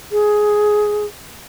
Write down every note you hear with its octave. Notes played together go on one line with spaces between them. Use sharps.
G#4